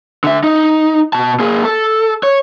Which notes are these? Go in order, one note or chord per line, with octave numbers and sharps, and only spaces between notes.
D3 E5
D#4
B2 A5
A#3 G#4
A4
C#5